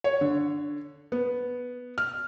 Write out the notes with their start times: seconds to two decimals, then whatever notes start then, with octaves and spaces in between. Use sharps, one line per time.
0.04 C#5
0.21 D3
1.12 B3
1.98 F6